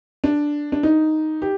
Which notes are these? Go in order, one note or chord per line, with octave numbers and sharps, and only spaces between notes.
D4
D4
D#4
G4